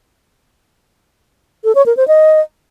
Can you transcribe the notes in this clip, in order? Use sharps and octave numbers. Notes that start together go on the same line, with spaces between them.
A4
C#5
A#4
C5
D#5